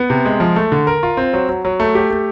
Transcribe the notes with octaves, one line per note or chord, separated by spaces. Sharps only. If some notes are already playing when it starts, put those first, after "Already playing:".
Already playing: B3
C3
G#3
F3
A3
D3
A#4
F4
C4
F#3
F#3
F#3
A3
G4
A3